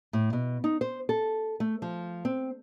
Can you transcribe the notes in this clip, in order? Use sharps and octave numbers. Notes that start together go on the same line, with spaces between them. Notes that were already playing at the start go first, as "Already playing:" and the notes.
A2
B2
D#4
C5
A4
A3
F3
C4